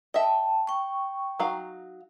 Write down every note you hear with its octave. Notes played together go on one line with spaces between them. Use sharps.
D#5 E5 G5 A5
G5 C#6
F#3 D#4 F5